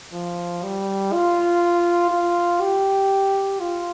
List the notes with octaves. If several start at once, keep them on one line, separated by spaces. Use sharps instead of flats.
F3
G3
F4
F4
G4
F4